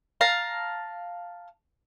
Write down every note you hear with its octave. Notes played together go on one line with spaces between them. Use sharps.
F5 A5 A#5